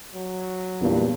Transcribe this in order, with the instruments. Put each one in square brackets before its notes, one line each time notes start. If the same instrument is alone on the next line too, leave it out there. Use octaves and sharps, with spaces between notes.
[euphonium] F#3
[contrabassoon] E2 [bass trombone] G2 [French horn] A#2